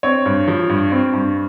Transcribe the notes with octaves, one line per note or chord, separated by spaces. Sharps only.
C4 C#5
G2
F3
G2
C4
G2